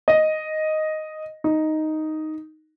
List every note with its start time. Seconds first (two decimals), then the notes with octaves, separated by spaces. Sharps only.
0.08 D#5
1.44 D#4